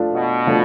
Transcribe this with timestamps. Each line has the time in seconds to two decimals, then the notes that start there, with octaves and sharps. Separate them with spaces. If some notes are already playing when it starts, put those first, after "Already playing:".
Already playing: F3 A3 D4 F4
0.13 B2
0.47 F3 A3 D4